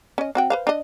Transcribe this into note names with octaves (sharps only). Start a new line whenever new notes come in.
C#4 D#5
C4 F#4 G5
B4 C5 F5
D4 D#5